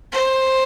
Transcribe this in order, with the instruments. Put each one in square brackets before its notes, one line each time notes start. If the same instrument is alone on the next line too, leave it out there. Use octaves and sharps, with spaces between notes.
[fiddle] C5